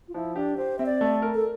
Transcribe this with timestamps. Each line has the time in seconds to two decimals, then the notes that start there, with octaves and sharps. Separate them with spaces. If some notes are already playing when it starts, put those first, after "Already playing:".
0.08 F4
0.14 F3 E4
0.36 D4 G4
0.57 G4 C5
0.79 C4 E5
0.86 D5
1.01 A3
1.22 A#4
1.34 A4